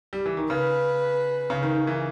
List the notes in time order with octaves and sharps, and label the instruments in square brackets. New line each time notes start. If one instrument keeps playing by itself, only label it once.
[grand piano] G3
E3
D#3
[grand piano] C#3 [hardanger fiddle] B4
[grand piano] C#3
D#3
D#3
E3